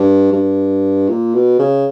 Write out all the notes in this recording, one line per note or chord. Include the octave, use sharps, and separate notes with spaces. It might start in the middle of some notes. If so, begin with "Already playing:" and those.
Already playing: G2
G2
A#2
B2
C#3